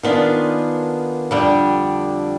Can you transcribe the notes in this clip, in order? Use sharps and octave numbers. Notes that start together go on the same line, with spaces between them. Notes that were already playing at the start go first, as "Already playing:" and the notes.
D#3 B3 D4 F4 G#4
F2 D3 G3 D4